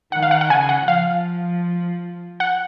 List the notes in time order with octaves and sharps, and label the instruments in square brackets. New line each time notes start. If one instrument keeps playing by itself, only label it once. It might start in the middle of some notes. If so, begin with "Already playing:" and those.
[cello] D#3 [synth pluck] F#5
[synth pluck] F5
F#5
F#5
[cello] C#3 [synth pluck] G#5
[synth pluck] F#5
[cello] F3 [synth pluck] F5
[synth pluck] F#5